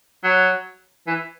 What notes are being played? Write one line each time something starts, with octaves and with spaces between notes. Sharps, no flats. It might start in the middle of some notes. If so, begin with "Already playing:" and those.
F#3
E3